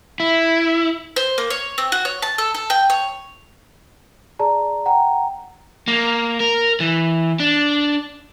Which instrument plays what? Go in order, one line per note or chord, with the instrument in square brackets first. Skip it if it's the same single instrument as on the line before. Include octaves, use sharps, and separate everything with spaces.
[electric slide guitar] E4
[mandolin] C5
A#3
C#5
C4
F#4
C#5
A5
A4
A4
G5
C#5
[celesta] G#4 D5 A5 A#5
F#5 G5 A#5
[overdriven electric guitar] A#3
A#4
E3
D4